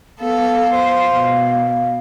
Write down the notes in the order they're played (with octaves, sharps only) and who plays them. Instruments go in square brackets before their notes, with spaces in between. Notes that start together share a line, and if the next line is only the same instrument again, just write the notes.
[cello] B3 A4 [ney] F5
[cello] C5
B2